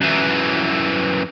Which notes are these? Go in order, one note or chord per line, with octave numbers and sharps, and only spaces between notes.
F#2 E3